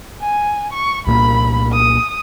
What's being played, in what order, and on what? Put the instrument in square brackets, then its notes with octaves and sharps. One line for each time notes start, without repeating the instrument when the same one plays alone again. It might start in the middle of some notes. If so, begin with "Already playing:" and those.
[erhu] G#5
C#6
[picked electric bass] C2 A#2 A#3 [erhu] B5
[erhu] D#6